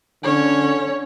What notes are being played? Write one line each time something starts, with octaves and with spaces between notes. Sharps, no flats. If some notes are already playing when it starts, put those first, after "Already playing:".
D3 C#4 C#5